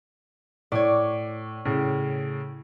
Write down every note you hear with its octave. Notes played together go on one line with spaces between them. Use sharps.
A2 C#5 D5
A2 C#3